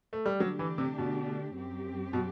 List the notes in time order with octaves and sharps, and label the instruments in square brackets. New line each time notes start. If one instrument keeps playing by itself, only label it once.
[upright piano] A3
G3
[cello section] D3 A3 D4 G4 [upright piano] F#3
[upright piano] E3
C3
B2
[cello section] F#2 F#3 C4 G4
[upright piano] B2